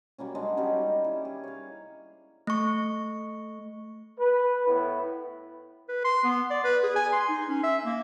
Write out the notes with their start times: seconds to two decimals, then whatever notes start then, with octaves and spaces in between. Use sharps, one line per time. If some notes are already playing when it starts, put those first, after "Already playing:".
0.18 F#3 G3 A#3 C#4
0.35 F#3 G#3 D4 F#4
0.57 D#3 G3 C#4 G4
1.04 E4
1.25 G#4
1.44 C#5 F5
2.47 A3 C#6
4.19 B4
4.66 A2 B3 E4
5.89 B4
6.05 C6
6.24 B3
6.50 D5
6.64 B4
6.83 G#4
6.95 G#5
7.13 C6
7.29 D#4
7.49 C#4
7.63 E5
7.85 A#3